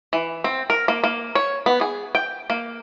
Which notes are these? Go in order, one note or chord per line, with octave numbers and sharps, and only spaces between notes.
E3
C4
A#4
A#3
A#3
C#5
B3
G#4
G5
A#3